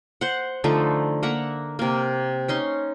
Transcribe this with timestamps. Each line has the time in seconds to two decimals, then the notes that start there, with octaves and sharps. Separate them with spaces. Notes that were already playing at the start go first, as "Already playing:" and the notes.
0.21 C5 F#5
0.64 D3 F3 A3 D#4
1.23 A#3 E5 F#5 A#5
1.79 C3 A#3
2.48 C#4 D#4 C6